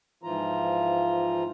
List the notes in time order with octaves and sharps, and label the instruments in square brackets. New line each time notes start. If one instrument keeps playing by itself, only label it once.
[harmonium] G#2 E3 F3 F4 A#5